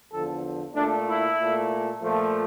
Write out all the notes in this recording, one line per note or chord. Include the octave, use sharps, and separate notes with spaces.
E2 D3 F3 A4
A#2 A3 D4
E4
A#2 A3
A#2 F3 A3